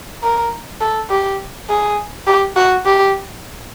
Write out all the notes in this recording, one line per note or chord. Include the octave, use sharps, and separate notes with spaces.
A#4
A4
G4
G#4
G4
F#4
G4